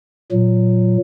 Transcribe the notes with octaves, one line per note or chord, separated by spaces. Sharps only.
A#2 F#3